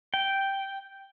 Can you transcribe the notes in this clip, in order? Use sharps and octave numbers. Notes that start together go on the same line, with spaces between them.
G5